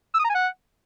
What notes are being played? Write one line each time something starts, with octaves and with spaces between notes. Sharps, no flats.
E6
D#6
A#5
G#5
F#5